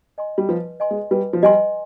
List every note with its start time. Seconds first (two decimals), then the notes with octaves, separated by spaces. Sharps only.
0.18 D#5 G#5 C6
0.38 G3
0.49 F3 B4
0.80 D#5 G#5 C6
0.91 G#3
1.11 G3 B4
1.33 F3
1.43 G3 D#5 G#5 C6